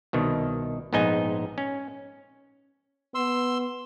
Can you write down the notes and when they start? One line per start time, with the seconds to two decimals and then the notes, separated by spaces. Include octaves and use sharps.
0.13 C2 B2 D#3
0.93 A#1 G#2 B3 D#4 D#5 G#5
1.58 C#4
3.15 B3 C6 E6